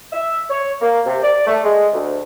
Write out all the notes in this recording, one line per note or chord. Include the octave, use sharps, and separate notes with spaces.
E5
C#5
A#3
C3
D5
A3
G#3
D2